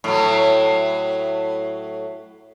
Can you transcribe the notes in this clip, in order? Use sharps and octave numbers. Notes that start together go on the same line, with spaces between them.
A2 F#3